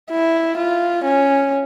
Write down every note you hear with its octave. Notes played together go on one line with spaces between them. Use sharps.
E4
F4
C#4